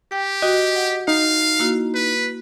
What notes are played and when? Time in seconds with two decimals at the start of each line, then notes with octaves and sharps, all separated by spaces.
0.12 G4 G5
0.42 F#4 D#5 G5
0.76 F#5
1.08 D#4 F5
1.60 A#3 E4 F#4
1.95 B4